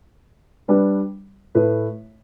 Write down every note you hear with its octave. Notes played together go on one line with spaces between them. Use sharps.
G3 D4 B4
A2 A3 E4 B4